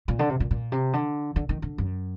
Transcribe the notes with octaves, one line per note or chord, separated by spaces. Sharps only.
A#2
D3
C3
A#2
A#2
C3
D3
D3
D#3
D3
F#2